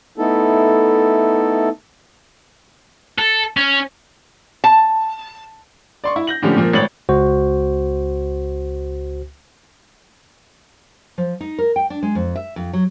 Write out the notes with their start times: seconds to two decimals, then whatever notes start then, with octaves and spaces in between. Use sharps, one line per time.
0.18 A3 B3 D#4 E4 A4
3.18 A4
3.57 C#4
4.64 A5
6.04 D5 C6 C#6
6.16 E4
6.27 G6 A#6 F#7
6.42 A2 D3 F3 C#4 G4
6.56 A#2 F3 A#3
6.73 G#1 A2 C#5 A6 F#7
7.09 C#2 F#4 C5
11.18 F3
11.41 D#4
11.59 A#4
11.76 G5
11.90 D4
12.02 G#3
12.15 F2
12.36 E5
12.56 F2
12.73 F#3